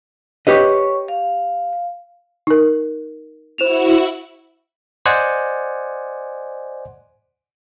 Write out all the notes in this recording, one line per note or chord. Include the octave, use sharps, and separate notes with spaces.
G4 B4 C#5 D#5 C#6
F5
D#4 A#4
E4 F#4 C5 E7 F7
C5 D5 D#5 F#5 G#5